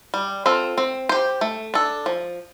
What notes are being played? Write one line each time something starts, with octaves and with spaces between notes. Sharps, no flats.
G3
C4 F4 A4
C4
G4 C5
A3
D4 A4
F3